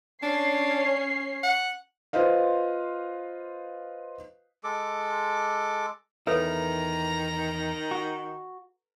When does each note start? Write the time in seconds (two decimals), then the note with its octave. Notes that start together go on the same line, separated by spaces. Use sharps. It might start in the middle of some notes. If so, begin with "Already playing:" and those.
0.23 C#4 D4 C#5 C7
1.43 F#5
2.13 F4 B4 C5 D#5 F5
4.64 G#3 A4 D6
6.27 E2 D#3 E4 A4 B4 C#5 A#5
7.91 F#4